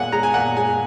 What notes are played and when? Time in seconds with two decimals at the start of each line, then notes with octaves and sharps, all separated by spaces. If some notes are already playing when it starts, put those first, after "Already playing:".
Already playing: A#2 G#3 F#5 G#5
0.12 G#3 A#5
0.23 G#5
0.34 A#2 F#5
0.57 G#3 G#5